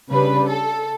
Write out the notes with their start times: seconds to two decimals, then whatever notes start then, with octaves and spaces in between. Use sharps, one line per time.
0.11 C#3 G3 D4 B4
0.48 A4